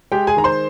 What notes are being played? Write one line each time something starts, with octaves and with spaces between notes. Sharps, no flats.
G#3 G4 G5
G#4 G#5
D#3 A#5
C5 C6